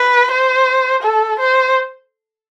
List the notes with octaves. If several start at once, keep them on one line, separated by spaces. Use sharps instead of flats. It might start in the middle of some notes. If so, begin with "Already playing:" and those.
Already playing: B4
C5
A4
C5